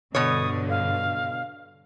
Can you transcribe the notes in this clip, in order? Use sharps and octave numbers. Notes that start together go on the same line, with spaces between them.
G2 B2 D3 C#5 D#6
F5